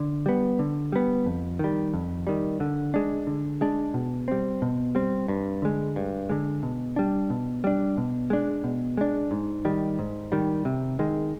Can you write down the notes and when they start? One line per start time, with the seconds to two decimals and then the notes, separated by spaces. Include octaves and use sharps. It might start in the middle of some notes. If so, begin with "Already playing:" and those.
Already playing: D3
0.26 G3 B3
0.59 D3
0.92 G3 B3
1.26 F2
1.59 D#3 G3
1.94 F2
2.27 D#3 G3
2.60 D3
2.94 G#3 D4
3.27 D3
3.61 G#3 D4
3.94 B2
4.28 G3 C4
4.62 B2
4.95 G3 C4
5.28 G2
5.62 D3 G#3
5.96 G2
6.29 D3 G#3
6.63 B2
6.96 G3 D4
7.30 B2
7.64 G3 D4
7.97 B2
8.30 G#3 D4
8.64 B2
8.97 G#3 D4
9.31 G#2
9.65 D#3 G3
9.99 G#2
10.32 D#3 G3
10.65 C3
10.99 D#3 G#3